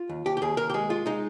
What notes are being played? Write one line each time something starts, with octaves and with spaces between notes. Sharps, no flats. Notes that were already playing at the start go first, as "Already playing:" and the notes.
Already playing: F4
D#2
D#2 G4
G4
D#2 G#4
D#2 A#4
G4
G#3 G#4
G#3 F4
G#3 D#4